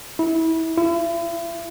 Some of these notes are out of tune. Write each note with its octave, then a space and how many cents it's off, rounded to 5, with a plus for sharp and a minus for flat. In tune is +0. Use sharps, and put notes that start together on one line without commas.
E4 -25
E4 +40